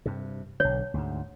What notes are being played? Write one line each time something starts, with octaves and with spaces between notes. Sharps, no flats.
G2 C3
B1 D3 C#5
D2 G#2